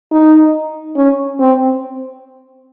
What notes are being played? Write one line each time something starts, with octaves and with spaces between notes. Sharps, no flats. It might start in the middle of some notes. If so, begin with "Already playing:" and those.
D#4
C#4
C4